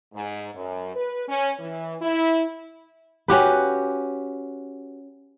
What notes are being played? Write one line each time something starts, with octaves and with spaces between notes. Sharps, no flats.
G#2
F#2
B4
C#4
E3
E4
C#4 F#4 G4 B4